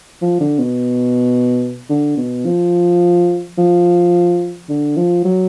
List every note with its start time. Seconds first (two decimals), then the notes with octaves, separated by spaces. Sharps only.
0.21 F3
0.40 D3
0.59 B2
1.89 D3
2.17 B2
2.45 F3
3.58 F3
4.69 D3
4.97 F3
5.24 F#3